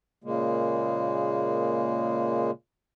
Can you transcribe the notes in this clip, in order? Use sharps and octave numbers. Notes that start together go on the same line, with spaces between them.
A#2 C#3 G#3 A#3